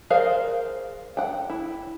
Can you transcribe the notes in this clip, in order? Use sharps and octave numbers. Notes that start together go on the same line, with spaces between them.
G#4 A#4 C5 D5 F5
F#5 G5
E4